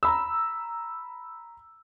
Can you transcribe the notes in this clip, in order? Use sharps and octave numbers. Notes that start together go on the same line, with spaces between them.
A#5 B5 E6